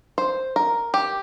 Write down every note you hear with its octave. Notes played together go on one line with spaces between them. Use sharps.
C5
A#4
G4